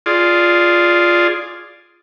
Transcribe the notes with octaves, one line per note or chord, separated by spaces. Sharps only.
F4 G#4 D5